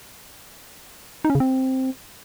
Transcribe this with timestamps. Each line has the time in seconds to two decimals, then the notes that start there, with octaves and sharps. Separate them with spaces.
1.25 D#4
1.30 C#4
1.35 C#3
1.40 C4